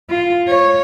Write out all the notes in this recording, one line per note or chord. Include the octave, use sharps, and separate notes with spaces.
F4
C#5